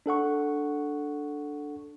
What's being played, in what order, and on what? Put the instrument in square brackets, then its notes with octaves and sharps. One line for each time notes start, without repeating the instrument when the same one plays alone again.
[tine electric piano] D4 A4 F#5 C#6